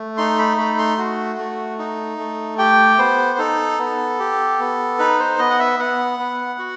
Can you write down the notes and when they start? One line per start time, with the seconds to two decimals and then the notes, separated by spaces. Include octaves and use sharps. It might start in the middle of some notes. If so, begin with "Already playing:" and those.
Already playing: A3
0.17 D#4 C6
0.38 B5
0.58 A3 B5
0.79 C6
0.98 F#4
1.39 A3
1.79 D#4
2.18 A3
2.58 G4 G5
2.98 B3 C5
3.38 D#4 A4
3.79 B3
4.19 G4
4.60 B3
4.99 D#4 B4
5.19 C5
5.39 B3 D#5
5.50 F#5
5.59 E5
5.79 B3 F#5
6.19 B3
6.59 F#4